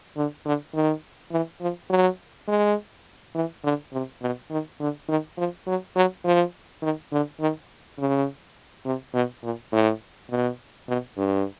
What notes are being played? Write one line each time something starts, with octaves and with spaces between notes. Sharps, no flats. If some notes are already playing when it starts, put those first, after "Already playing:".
D3
D3
D#3
E3
F3
F#3
G#3
E3
D3
C3
B2
D#3
D3
D#3
F3
F#3
F#3
F3
D#3
D3
D#3
C#3
C3
B2
A#2
A2
B2
B2
G2